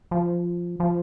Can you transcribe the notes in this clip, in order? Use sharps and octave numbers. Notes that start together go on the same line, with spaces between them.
F3
F3